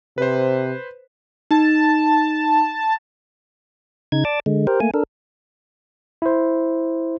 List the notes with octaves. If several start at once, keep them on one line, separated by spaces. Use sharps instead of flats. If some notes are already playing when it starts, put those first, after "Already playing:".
C3 B4 C5
D#4 A5
C#3 D#4 G#6
D5 A5 D6
D3 G#3
G4 A#4 C5
A3 A#3 G#5
D4 A4 A#4
E4 C5